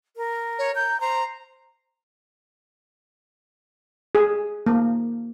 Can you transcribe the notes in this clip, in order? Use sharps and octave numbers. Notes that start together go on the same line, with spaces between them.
A#4
C#5
A#5 G6
C5 A#5
G#4
A#3